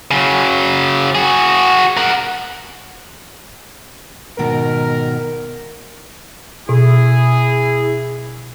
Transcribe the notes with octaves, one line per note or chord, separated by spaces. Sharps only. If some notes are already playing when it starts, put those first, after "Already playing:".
C#3 F#3
F#4 G#4
A#4 F#5
G#2 B2 D#3 A#4
B2 E4 G#4